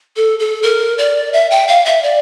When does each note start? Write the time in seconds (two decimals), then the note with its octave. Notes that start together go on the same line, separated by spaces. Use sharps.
0.16 A4
0.39 A4
0.63 A#4
0.98 D5
1.33 E5
1.50 G5
1.68 F5
1.85 E5
2.03 D5